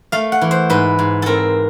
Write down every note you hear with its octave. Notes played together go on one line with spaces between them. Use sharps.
A3 F5
F#5
E3
C5
G#2 B4
G#2
C4 A4 A#4